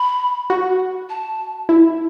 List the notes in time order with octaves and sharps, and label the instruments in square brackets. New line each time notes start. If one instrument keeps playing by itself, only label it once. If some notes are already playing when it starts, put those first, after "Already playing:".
Already playing: [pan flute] B5
[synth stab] F#4
[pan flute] A5
[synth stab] E4